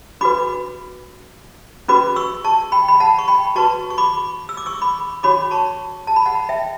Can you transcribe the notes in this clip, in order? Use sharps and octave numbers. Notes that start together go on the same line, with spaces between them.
D4 F#4 B4 B5 D6
C#4 F#4 B4 B5 D6
C#6 E6
A5 C#6
G5 B5
B5
F#5 A5
C#6
G5 B5
F#4 B4 A5 C#6
C#6
B5 D6
E6
D6
C#6 E6
B5 D6
D4 F#4 C#5 B5 D6
A5 C#6
A5
B5
F#5 A5
E5 G5